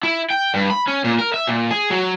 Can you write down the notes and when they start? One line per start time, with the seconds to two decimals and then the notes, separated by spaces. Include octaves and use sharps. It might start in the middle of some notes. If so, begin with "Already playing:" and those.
0.03 E4
0.30 G5
0.54 G2
0.70 B5
0.87 C#4
1.04 A#2
1.19 A#4
1.34 E5
1.48 A#2
1.70 G#4
1.90 F#3